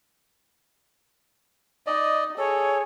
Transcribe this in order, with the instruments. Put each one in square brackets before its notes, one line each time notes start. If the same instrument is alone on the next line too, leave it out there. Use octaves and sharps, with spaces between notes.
[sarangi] D#4 [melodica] D5 D#5
[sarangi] G#4 [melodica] A4 [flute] C#5